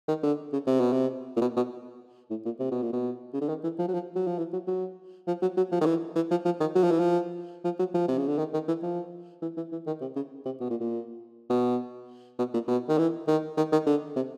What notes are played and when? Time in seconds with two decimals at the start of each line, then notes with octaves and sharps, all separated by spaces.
0.08 D#3
0.23 D3
0.53 C#3
0.67 C3
0.80 B2
0.92 C3
1.37 A#2
1.41 B2
1.56 B2
2.30 A2
2.45 A#2
2.60 C3
2.71 B2
2.82 A#2
2.93 B2
3.34 C#3
3.41 D3
3.49 D#3
3.64 E3
3.79 F3
3.88 F#3
3.94 F3
4.16 F#3
4.27 F3
4.38 E3
4.53 F#3
4.67 F#3
5.27 F3
5.42 F#3
5.57 F#3
5.72 F3
5.81 D#3
5.86 E3
6.16 E3
6.31 F3
6.45 F3
6.60 D#3
6.75 F#3
6.83 F3
6.91 E3
6.99 F3
7.64 F3
7.79 F#3
7.94 F3
8.08 C3
8.18 C#3
8.28 D3
8.38 D#3
8.53 D#3
8.68 E3
8.83 F3
9.42 E3
9.57 E3
9.72 E3
9.87 D#3
10.01 C3
10.16 C#3
10.45 C3
10.61 B2
10.71 A#2
10.81 A#2
11.50 B2
12.39 B2
12.54 A#2
12.68 B2
12.89 D#3
12.98 E3
13.28 D#3
13.57 D#3
13.72 D#3
13.86 D3
14.16 C3